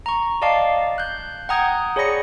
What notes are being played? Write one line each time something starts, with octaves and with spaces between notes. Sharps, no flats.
A#5 C#6
D5 D#5 F5 A5 D6 C7
F#6 G6
F#5 G5 A#5 D#6 G6 G#6
G#4 C#5 D5 B5 A#6 C#7